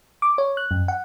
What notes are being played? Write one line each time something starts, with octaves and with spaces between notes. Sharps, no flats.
D6
C#5
F#6
F#2
F#5